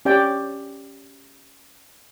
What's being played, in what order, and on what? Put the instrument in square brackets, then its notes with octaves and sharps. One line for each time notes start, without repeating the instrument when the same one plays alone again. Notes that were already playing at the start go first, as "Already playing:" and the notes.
[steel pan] C#4 G4 D5 G5